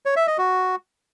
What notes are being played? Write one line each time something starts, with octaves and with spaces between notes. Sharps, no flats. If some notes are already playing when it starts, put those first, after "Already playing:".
C#5
E5
D#5
F#4